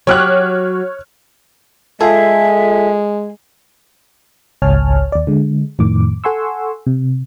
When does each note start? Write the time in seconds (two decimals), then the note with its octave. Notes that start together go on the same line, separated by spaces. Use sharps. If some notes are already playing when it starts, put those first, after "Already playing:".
0.07 F#3 G4 C#5 F6 F#6
2.01 G#3 F4 G#4 A4 E5
4.62 G#1 C#2 C#5 G#5 A5 F6
5.12 D#2 D5
5.27 D3 G#3
5.79 F2 A2 D#3 D6
6.24 A4 F#5 G#5 C6 C#6 E6
6.86 C3